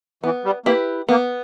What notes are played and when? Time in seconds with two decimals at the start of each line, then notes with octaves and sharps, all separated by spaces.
0.23 E3 B3
0.45 G3
0.66 A#3 E4 G4 B4
1.09 A#3 B3